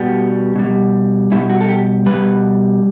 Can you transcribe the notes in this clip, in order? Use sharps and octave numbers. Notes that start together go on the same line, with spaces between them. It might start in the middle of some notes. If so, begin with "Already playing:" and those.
Already playing: B2 G3 B3
B2 G3
B2 G3 E4
F#4
A4
G4
B2 G3 B4